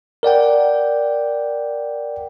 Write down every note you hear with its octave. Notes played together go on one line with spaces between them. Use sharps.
A#4 D5 F#5 G5